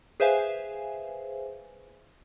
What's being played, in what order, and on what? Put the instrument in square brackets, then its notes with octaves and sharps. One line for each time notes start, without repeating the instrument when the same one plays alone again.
[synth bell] G#4 B4 C5 E5 F5 G#5